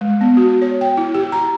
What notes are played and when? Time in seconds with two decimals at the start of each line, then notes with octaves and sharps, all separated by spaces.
0.01 G#3
0.21 B3
0.37 F#4
0.62 C#5
0.81 G5
0.97 E4
1.15 G4
1.32 A#5